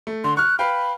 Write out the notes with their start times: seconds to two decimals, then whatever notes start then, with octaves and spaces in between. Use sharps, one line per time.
0.07 A3
0.24 D3 C6
0.37 C#6 F6 F#6
0.59 B4 F5 G5 B5